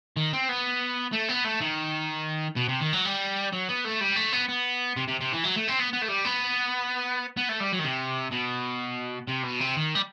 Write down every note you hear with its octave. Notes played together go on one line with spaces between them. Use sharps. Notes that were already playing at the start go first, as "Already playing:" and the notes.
D#3
C4
B3
A3
B3
A3
D#3
B2
C3
D#3
F#3
G3
F#3
B3
A3
G3
A3
B3
B3
C3
C3
C3
E3
F#3
A3
C4
B3
B3
A3
G3
B3
B3
A3
G3
F#3
D#3
C3
B2
C3
B2
C3
D#3
G3